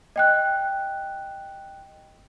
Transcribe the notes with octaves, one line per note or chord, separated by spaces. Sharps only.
D#5 G5 F#6